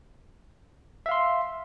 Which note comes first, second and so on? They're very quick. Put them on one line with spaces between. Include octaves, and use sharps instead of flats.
E5 F5 C6